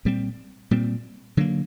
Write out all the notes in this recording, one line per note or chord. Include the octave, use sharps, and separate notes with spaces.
A#2 G3 C4
A#2 G3 C4
D3 F#3 A#3